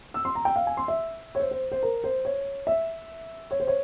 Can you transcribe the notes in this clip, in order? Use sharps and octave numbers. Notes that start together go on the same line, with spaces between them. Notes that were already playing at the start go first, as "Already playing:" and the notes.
E6
C6
A#5
G5
F5
G#5
C6
E5
C#5
C5
C5
C5
A#4
C5
C#5
E5
C#5
C5
C#5